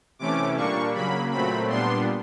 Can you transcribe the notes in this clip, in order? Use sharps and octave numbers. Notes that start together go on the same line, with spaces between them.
C3 E3 A3 C#4 D6
A#2 G3 A#3 D4 C#6
C#3 F#3 A#3 B5
A#2 F#3 A3 C4 B5
A#2 G3 B3 D4 C6